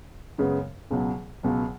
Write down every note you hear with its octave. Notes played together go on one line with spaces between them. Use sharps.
F#2 C#3 G#3 B3
C#2 B2 F#3
C#2 B2 F#3